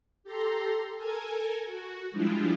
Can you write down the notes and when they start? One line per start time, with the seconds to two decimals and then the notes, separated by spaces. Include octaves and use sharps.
0.24 G4 A4 A#5 C6
0.95 A4 A#4 G#5 G#6
1.66 F#4
2.11 F3 G3 G#3 D4 E4 F4